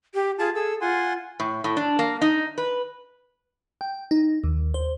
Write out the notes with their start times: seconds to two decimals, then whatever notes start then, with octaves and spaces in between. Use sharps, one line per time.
0.14 G4
0.39 F4 G#4 A5
0.55 G#4 A4 E6
0.81 F4 F#5 G#5 C6
1.40 A2
1.64 A2
1.77 D4
1.99 A#3
2.22 D#4
2.58 B4
3.81 G5
4.11 D#4
4.44 D#2
4.74 C5